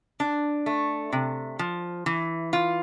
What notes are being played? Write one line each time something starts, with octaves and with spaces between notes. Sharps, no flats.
D4
A3
C3
F3
E3
F4